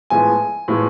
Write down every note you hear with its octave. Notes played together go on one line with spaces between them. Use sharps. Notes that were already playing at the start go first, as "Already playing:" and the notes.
A2 F3 G#3 B3 G#5
A2 F3 G#3 B3